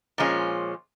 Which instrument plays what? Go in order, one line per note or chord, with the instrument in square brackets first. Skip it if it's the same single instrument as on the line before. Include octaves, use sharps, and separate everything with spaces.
[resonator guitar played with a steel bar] A#2 F3 G#3 C#4